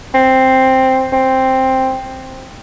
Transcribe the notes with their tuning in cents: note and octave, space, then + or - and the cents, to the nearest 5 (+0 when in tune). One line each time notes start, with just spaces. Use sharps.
C4 +0
C4 +5